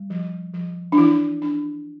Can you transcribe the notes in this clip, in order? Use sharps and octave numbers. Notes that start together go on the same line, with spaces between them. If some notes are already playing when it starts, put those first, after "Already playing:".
Already playing: G3
F3
F3
D4
E3 E4
D4